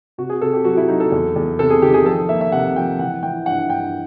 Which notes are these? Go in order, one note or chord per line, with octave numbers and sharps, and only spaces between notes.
C3 F#4
G#4
C3 A4
G4
F#3 F#4
E4
F#3 D#4
A4
E2
E2
C3 A4
G#4
D#3 G4
G#4
F3 A4
A#3 E5
E5
C3 F#5
F3 G5
E3 F#5
E3 G5
G2 F#5
G2 G5